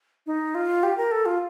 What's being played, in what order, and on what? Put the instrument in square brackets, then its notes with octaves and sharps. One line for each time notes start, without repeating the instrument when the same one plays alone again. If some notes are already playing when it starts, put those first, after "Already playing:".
[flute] D#4
F4
G4
A#4
A4
F4